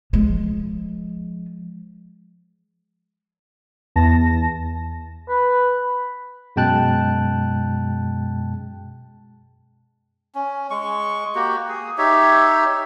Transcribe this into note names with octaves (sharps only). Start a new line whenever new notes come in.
F3 G#3
E2 A5 A#6
B4
F#2 B2 G#3 G5 A5 F#6
C#4
G#3 C#6
A#3 F#4 G4
G#4
D#4 G4 C#5 E5